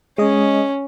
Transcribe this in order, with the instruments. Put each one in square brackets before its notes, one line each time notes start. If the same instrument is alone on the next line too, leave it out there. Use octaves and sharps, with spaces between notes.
[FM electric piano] G#3 D#5 [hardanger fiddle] C#4